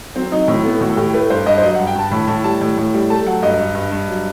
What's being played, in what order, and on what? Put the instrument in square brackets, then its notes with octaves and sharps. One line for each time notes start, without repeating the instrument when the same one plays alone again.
[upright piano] F#3 C4
F#3 D#4
A2 C4
A3 B3
A2 F#4
A4
A2 G4
A3 B4
G2 C5
G2 D#5
C5
F#3 D#5
G2 F#5
G5
G2 A5
A2 B5
A2 A5
G3 A5
A2
A2
G3
A3 A5
F#3 F#5
G2 D#5
G2
G2
G2
F#3